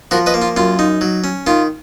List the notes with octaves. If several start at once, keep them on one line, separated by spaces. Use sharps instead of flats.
F3 F#4 A#4
B4 D#5
A#3
F4
F#2 F4
D#4
F#3
C#4
D#3 F4